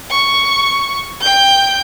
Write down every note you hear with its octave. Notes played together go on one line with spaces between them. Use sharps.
C#6
G5 G6